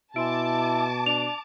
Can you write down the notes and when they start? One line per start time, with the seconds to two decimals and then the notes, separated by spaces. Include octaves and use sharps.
0.16 B2 E4 G#5 A5 C6 D6 D7
1.06 D4 F7